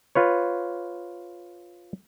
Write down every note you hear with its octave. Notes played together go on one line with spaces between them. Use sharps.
F4 B4 C#5